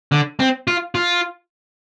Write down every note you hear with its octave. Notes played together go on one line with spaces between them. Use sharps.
D3
C4
F4
F4